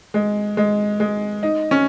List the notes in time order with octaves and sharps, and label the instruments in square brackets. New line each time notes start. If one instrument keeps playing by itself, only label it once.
[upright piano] G#3
G#3
G#3
D#4
C#4